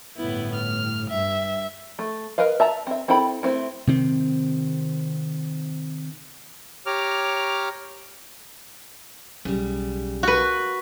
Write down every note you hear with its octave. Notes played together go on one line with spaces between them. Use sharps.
G1 A2 B3 E4
F6
G2 E5
A3
A#4 B4 D#5 F5
E5 A5 A#5
C4 E5
C4 E4 A4 G5 B5
A3 C4 E4
C3 D#3 C4
G4 C#5 A#5 D6 F6
B1 C#3 G3
F#4 B4